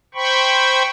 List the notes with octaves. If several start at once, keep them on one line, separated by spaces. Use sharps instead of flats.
C5 G5 B5 C#6